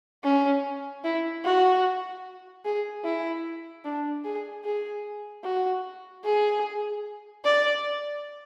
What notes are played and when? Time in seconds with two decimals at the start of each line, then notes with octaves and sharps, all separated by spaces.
0.24 C#4
1.05 E4
1.45 F#4
2.65 G#4
3.04 E4
3.85 D4
4.24 G#4
4.65 G#4
5.44 F#4
6.24 G#4
7.45 D5